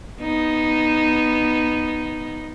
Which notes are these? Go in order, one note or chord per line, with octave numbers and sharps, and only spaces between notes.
B3 D#4